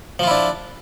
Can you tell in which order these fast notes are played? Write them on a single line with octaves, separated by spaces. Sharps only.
F3 F4 E4 D4